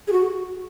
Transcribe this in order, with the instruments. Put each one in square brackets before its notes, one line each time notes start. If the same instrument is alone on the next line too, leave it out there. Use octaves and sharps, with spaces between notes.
[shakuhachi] G#4
F#4